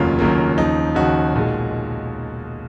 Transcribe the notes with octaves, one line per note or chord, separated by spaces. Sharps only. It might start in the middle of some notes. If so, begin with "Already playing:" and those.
Already playing: F1 D#2 C#3 F#3 A#3 F4
F1 D#2 C#3 F#3 A#3
D#2 C#3 F3 D#4
D#2 C#3 F3 D#4 F#4
B1 A#2 G#3